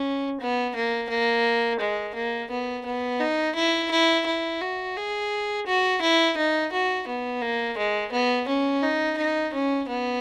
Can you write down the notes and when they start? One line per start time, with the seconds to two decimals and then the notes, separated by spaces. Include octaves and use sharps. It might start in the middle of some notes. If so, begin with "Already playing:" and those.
Already playing: C#4
0.40 B3
0.76 A#3
1.10 A#3
1.80 G#3
2.15 A#3
2.50 B3
2.85 B3
3.20 D#4
3.56 E4
3.91 E4
4.26 E4
4.61 F#4
4.96 G#4
5.67 F#4
6.02 E4
6.38 D#4
6.72 F#4
7.08 B3
7.42 A#3
7.77 G#3
8.12 B3
8.48 C#4
8.83 D#4
9.18 D#4
9.53 C#4
9.89 B3